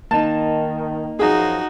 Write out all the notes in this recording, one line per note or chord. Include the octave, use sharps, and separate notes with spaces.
D#3 A#3 D#4 A5
F#2 F3 D#4 F#4 G#4